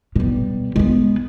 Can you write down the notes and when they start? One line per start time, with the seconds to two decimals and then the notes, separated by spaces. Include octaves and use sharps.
0.16 B2 G3
0.76 G#3 B3